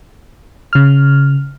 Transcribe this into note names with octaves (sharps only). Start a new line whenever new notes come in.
C#3 F6